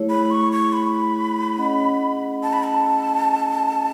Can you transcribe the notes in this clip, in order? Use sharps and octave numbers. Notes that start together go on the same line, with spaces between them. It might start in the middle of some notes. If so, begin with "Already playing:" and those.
Already playing: A3 E4 G#4 C#5
B5
C#6
C#6
B5
C#4 G#4 D#5 F#5
A5
B5
A5